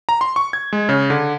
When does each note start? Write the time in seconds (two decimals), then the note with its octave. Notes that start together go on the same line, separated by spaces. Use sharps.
0.09 A#5
0.21 C6
0.36 C#6
0.53 G#6
0.73 G#3
0.89 C#3
1.10 D3